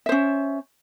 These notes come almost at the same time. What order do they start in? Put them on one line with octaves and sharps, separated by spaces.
E5 C5 C#4